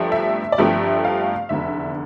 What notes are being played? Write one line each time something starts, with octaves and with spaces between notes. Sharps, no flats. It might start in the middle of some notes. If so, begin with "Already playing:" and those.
Already playing: G1 G2 F3 A3 C4
E5
D5
G1 G2 F3 A3 C4 E5
F5
F1 E2 D3 E5